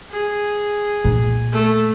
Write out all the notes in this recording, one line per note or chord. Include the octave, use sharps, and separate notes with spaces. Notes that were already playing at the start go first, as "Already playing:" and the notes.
G#4
A#2
A3